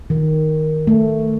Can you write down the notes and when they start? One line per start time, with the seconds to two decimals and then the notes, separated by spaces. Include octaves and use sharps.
0.10 D#3
0.87 A3